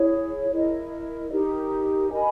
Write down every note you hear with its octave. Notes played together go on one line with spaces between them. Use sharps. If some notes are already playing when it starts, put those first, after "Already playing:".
Already playing: E4 G#4 C#5
E4 A#4 D#5
D#4 G4 A#4
A#4 D#5 G#5 B5